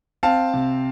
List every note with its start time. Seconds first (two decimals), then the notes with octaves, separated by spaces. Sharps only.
0.23 C4 F5 A5
0.54 C3